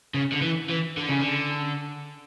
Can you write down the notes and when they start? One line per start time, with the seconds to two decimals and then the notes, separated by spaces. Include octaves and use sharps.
0.14 C#3
0.32 D3
0.42 E3
0.70 E3
0.97 D3
1.09 C#3
1.20 D3